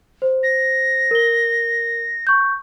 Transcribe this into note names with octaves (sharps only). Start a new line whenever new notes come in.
C5
A#6
A#4 G7
C#6 G6